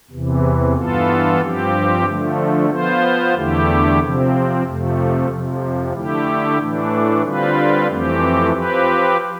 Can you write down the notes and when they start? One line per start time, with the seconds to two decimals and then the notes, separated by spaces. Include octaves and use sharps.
0.11 E2 C3 E3
0.76 G2 E3 B3 F4 A4
1.41 G2 F3 C4 G4
2.05 D3 F3 A3
2.70 F3 B3 F4 C5
3.35 E2 D3 A3 E4 G4
3.99 C3 F3 C4
4.64 F2 C3 F3 A3
5.28 F2 C3 F3
5.94 D3 A3 E4 G4
6.58 A2 E3 A3 D4
7.23 D3 G3 C4 F4 B4
7.87 F2 E3 A3 C4 G4
8.52 F3 C4 G4 B4